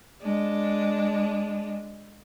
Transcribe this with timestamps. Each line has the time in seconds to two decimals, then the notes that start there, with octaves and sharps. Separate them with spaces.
0.21 G#3 D4